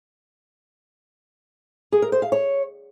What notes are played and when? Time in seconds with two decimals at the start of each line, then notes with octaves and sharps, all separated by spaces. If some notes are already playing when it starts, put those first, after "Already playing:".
1.92 G#4
2.02 A#4
2.12 C5
2.22 F5
2.32 C#5